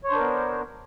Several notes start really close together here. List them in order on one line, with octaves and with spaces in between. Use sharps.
C#5 C5 D4 A#4 B3